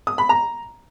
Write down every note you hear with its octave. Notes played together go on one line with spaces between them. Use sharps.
D#6
B5
A#5